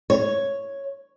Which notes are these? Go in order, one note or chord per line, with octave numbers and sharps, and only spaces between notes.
C#5